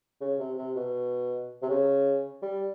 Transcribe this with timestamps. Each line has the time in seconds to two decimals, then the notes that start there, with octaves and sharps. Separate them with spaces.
0.21 C#3
0.39 C3
0.57 C3
0.76 B2
1.62 C3
1.70 C#3
2.43 G3